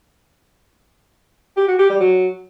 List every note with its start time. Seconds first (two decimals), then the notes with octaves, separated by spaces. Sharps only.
1.57 G4
1.68 F#4
1.79 G4
1.89 G3
2.00 F#3